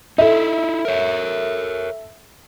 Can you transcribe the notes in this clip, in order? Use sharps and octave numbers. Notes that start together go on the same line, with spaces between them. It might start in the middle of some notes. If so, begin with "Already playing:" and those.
D#4 E4 A4 E5
A#4 C#5